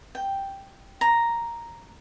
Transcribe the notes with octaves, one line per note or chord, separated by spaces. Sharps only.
G5
A#5